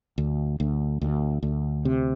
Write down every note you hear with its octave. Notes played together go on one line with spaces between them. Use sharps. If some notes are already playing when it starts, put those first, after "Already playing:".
D2
D2
D2
D2
C3